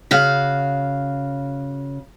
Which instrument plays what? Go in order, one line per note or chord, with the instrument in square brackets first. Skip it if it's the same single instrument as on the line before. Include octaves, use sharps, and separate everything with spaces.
[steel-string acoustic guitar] C#3 F#4 F5